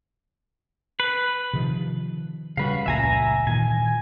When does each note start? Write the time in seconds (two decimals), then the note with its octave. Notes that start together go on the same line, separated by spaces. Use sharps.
1.00 B4
1.53 C3 D#3 F3
2.57 C#3 G3 F#4 B4 F5
2.86 F1 C#2 A#2 E5 G#5 A#5
3.47 A#2 D#3 E3 G#5